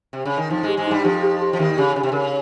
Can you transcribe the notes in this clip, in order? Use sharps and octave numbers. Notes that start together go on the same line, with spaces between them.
C3
C#3
D#3
F2 F3 D#4
G#2 G#3 G4
G#2 G#3
G2 G3 D#4
F2 F3 G4
G4
G4
F3
D#2 D#3 G4
C#3 G4
C#3 C#5
C3
C#3 A#4